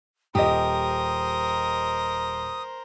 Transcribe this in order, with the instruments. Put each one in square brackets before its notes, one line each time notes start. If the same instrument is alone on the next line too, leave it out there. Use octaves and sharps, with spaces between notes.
[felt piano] D#1 D#5 [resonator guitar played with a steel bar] G4 [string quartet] A#4 C5 [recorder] D#6